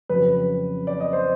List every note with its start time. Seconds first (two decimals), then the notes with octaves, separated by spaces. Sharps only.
0.09 F2 C#3 F#3 B4
0.87 D5
1.00 D#5
1.13 C5